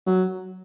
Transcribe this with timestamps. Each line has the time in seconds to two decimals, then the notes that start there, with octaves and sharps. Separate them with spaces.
0.07 F#3